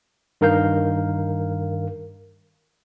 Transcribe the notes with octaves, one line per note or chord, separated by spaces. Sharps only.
G2 D#3 A#4 F5 G6